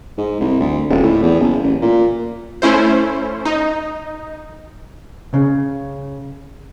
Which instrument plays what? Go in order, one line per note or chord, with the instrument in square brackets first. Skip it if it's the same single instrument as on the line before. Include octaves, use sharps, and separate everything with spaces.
[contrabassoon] G#2
C2
D2
D#1
A2
E2
F#1
A1
A#2
[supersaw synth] A3 C#4 E4 C5
D#4
[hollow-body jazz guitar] C#3